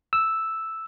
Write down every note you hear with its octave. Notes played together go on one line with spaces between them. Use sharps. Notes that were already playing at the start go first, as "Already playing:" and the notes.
E6